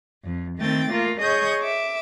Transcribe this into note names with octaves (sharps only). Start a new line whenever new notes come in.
F2
D#3 A3 C4 G5 A6
A3 A#3 F4 A#4
G#4 C#5 D#5 C#6 D#6 G6
E5 D6